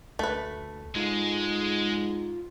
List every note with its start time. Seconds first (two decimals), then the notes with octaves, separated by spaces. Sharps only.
0.19 D2 A3 B4
0.95 G#2 G#3 F4